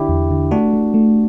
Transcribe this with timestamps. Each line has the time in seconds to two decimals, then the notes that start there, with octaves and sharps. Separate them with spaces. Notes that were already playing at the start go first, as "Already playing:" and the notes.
Already playing: D3 D4 E4 G4
0.09 E2
0.30 D3
0.51 A3 D4 F#4
0.73 A3
0.94 A3